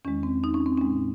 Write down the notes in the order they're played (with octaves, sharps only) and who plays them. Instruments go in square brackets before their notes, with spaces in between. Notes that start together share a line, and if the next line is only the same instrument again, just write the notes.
[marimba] E2 D#3 G#3 C#4
C4
D#4
C#4
C4
G#3 C#4
A2